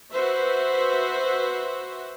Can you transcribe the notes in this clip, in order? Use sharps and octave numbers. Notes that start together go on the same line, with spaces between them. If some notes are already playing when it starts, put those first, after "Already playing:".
F#4 B4 C5 E5